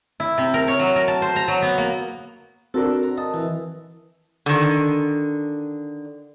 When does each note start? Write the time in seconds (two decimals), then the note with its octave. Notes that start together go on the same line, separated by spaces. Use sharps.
0.20 E4
0.38 C3
0.54 A#4
0.68 C#5
0.80 F#3
0.96 A#4
1.08 A5
1.22 C5
1.36 A#5
1.48 F#3
1.62 B3
1.78 A#3
2.74 C4 D4 F#4 A4 A#4
3.03 A#5
3.18 D#5 A5
3.34 E3
4.46 D3 D#3